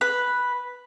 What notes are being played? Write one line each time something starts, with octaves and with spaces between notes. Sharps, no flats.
B4